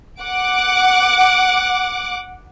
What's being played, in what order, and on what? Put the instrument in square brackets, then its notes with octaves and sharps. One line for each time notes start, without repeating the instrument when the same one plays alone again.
[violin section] F#5 D6